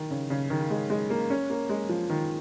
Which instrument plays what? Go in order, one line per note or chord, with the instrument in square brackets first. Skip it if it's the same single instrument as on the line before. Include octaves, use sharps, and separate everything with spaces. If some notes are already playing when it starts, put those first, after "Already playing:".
Already playing: [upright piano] D#3
C#3
C#3
D#3
G#3
G#3
A#3
C#4
A#3
G#3
F3
D#3